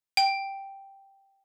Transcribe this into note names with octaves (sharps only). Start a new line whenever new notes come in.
G5